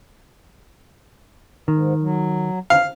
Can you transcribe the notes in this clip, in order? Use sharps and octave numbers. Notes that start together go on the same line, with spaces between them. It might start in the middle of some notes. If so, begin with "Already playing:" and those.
G#2 D#3
F#3
F5